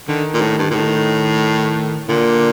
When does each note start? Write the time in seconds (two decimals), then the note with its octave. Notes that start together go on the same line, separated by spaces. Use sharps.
0.08 D3 D#3
0.34 A#2
0.41 A2
0.58 G2
0.70 A#2
0.75 A2 D#3
2.09 A#2 D3